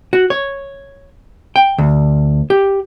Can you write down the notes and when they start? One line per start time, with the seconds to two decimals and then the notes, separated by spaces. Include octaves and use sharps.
0.13 F#4
0.30 C#5
1.56 G5
1.78 D2
2.50 G4